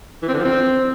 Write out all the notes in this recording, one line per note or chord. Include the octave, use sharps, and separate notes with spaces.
E3
C4
D3
F3
C4